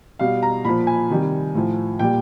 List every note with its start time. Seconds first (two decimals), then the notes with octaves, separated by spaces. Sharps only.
0.19 B2 G3 F5
0.43 A#5
0.65 A#2 F3 B5
0.87 G#5
1.10 C3 D#3 G3
1.55 A2 F3
1.99 A#2 G3 G5